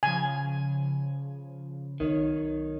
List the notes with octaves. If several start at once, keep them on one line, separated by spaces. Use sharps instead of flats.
C#3 F3 G#5
B1 D#3 C#5